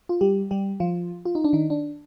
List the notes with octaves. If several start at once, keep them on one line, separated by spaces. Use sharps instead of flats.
F4
G3 G4
G3 G4
F3 F4
F4
D#4
D4
D#3 D#4
D4